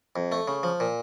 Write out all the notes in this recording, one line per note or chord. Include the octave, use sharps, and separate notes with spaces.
F2
A3
C#3
F3
A#2